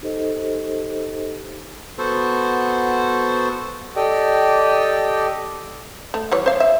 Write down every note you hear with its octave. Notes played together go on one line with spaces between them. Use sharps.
D#4 G4 A4 C5 D#5
B3 F#4 A4 C5
G4 A4 D5 D#5 G5
A3
E3 G3 C#5
C5 F5
E5